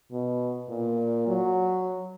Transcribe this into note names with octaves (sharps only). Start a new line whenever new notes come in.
B2
A#2
F#3